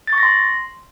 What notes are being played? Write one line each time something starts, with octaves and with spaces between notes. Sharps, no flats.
A6
C#6
A#6
C6